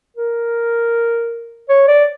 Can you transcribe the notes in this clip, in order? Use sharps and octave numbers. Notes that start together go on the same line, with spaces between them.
A#4
C#5
D5